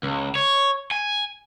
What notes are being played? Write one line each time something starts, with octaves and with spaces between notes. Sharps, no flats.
C#2
C#5
G#5